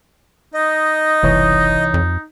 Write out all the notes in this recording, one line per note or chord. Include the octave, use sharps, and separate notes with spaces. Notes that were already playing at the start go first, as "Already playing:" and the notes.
D#4 D#5
F#1 C2 E3 C#5
F2